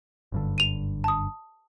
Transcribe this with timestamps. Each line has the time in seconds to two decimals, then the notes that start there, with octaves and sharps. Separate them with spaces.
0.32 F#1 G2 D3
0.58 D#7 F7
1.04 A5 D#6